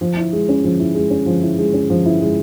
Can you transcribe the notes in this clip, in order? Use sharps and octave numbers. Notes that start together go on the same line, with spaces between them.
F3
E4
G#3
C#4
F3
E4
G#3
C#4
F3
E4
G#3
C#4
F3
E4
G#3